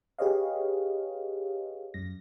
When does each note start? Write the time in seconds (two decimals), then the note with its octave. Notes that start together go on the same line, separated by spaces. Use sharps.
0.18 G4 G#4 B4 C#5 D#5 F5
1.94 F#2 A#6